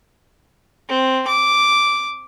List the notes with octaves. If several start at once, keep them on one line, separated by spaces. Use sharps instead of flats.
C4
D6